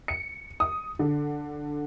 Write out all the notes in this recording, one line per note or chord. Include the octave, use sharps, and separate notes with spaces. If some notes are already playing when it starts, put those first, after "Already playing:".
C#7
D#6
D3